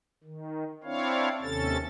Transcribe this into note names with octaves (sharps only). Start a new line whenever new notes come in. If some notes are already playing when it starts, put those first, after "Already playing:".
D#3
C4 D4 E4 C#5 F5
D#2 C3 C#4 A4 A6